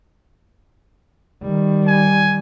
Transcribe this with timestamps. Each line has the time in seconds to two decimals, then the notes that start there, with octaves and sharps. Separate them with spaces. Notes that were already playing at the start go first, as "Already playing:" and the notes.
1.42 D#3 G3
1.88 G#5